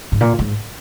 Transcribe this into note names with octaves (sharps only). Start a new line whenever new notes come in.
G#2
A#2
G#2